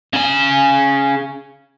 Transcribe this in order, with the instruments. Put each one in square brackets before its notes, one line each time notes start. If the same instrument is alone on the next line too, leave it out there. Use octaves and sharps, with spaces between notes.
[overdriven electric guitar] C#3 G#5